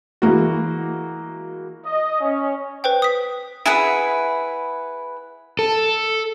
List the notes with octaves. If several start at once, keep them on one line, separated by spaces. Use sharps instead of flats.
E3 G#3 A#3 F#4
D#5
C#4
B4 C5 G5
D#6 B6
E4 G#4 B4 F#5
A4